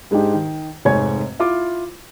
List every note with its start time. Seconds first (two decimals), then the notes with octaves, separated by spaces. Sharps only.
0.11 G#2 G#3 D4 D#4 G4
0.34 D#3
0.85 F1 G#2 C#5 G#5 G#6
1.39 E4 F4 D6